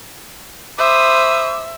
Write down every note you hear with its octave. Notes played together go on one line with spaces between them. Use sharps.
C5 E5 B5 D6 D#6